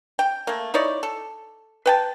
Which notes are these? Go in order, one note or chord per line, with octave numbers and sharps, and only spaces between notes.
G5
A3 A#3
D#4 E4 C#5 D5
A4
B4 G5 A5